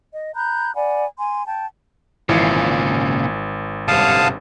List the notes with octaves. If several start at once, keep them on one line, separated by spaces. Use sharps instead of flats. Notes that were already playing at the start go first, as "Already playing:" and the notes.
D#5
A#5 B5 F#6 G6
D5 F#5 G#5 B5
G#5 C6
G5 A5
G#1 A#2 C#3 E3 F3 E4
G1 C2 D3 G3 F5 A5 D#6